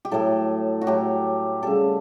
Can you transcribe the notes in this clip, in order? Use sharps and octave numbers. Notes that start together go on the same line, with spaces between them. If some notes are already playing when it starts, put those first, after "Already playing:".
G4
A2 F#3 A3 A4
F#4
A2 F#3 A3 G4
C#3 G3 A4